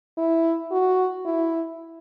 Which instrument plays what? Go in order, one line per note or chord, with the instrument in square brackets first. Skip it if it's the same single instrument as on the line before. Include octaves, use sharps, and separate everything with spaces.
[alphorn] E4
F#4
E4